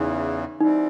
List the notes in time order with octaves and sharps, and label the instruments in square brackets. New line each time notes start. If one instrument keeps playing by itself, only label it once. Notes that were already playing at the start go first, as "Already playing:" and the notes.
Already playing: [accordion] E2 C#3 E3 [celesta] D#4
[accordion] E3 G3 C4 [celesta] D#4